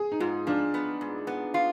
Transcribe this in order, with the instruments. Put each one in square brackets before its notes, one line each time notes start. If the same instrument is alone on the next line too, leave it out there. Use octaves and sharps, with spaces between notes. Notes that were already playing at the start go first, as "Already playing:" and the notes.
Already playing: [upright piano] G#4
D#4
[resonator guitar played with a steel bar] G#2 [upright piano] F4
[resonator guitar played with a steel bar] F3 [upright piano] D4
[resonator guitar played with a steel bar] B3
G#2
B3
F4